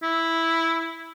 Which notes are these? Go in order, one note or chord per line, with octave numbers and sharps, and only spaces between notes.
E4